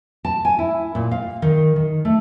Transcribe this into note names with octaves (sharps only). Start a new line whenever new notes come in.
A5
G#5
E4
A#2
F5
D#3
D#3
A3